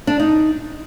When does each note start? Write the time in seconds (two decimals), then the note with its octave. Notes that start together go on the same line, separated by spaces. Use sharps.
0.07 D4
0.20 D#4